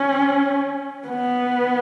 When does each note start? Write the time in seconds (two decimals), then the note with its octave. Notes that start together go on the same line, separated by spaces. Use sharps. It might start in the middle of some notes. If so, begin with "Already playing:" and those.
Already playing: C#4
1.08 B3